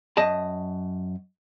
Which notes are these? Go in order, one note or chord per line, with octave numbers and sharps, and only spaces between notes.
F#2 D#5 A5